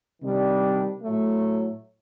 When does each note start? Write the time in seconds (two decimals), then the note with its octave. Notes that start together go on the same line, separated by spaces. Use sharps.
0.21 C3 D#3 G3 D4
1.02 A2 F#3 A3